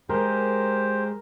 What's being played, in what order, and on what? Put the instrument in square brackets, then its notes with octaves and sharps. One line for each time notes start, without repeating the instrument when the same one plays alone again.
[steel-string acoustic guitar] G#3 G#4 [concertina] G4 C5 [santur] A#4